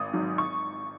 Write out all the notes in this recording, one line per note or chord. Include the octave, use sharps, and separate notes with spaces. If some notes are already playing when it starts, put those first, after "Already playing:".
Already playing: G#1 D#6
G#2 F#3
C#6